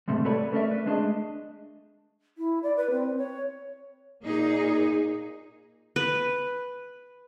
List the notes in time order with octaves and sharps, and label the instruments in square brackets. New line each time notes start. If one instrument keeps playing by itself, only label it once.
[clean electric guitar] E2 G#2 C3 G3 A3
G4 A4 B4 C#5 D5 B5
B4
A3 C#4 A4 A#4 D5 E5
B4
G#3 A3 D4 G#4 D#5
[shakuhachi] E4
D5
B4
C4
C#5
[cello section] A#2 A#3 D#4 G#4
[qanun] B4